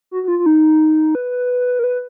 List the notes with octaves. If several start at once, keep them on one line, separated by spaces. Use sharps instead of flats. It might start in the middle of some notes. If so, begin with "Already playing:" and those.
F#4
F#4
F4
F4
D#4
B4
A#4
B4